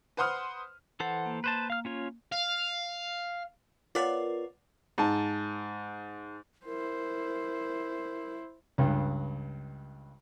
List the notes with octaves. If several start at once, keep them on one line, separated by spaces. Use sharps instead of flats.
B4 C5 F#5 C6 D#6 F6
E3 A4 C5 F#5
A#3
B4 C5 A5
F5 F6
C#4 F4 C#5
F5
B3 F4 A#4 C#5 D5
G#2 A5
E4 A#4 C5
C#2 G2